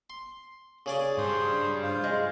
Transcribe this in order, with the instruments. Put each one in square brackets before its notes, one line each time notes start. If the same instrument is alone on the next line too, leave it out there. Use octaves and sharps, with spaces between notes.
[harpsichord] C6
C#3 G#4 D5
[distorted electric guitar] G2 G4 [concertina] C5 C6 D#6
[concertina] F4 C5 F5
[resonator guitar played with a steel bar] G#3